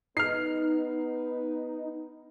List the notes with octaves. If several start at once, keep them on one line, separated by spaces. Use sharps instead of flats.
B3 D#4 B4 F6 C7